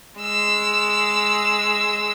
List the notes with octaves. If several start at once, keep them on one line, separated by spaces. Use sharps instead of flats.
G#3 E6